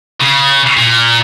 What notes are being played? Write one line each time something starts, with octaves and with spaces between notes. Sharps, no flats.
C#3
A#2